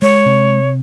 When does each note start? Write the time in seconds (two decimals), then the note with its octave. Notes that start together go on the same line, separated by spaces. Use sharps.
0.02 G#3 C#5
0.26 C3